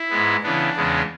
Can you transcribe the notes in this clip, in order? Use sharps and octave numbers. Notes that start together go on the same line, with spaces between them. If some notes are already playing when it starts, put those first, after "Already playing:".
Already playing: E4
G#2 G#3 B3
C#3 E3 B3 D4
E2 C#3 G#3 B3